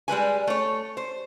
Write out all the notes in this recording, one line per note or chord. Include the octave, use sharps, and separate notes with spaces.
G3 G#3 B4 G#5
A3 C#5
C5